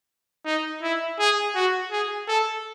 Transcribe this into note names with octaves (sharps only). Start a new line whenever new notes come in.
D#4
E4
G#4
F#4
G#4
A4